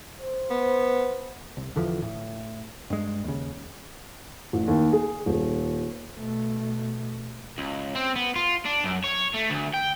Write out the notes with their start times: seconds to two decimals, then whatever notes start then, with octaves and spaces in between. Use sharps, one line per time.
0.20 C5
0.50 B3
1.57 C2
1.76 E2 D3 E3 F3
2.02 A2
2.90 G2 G#3
3.24 D#2 C#3
4.53 A1
4.68 D#2
4.93 G#4
5.26 D#1
6.16 B2 A3
7.58 C#2
7.95 C4
8.16 B3
8.36 F4
8.66 D4
8.85 F#2
9.04 C#5
9.34 A3
9.50 D2
9.74 G5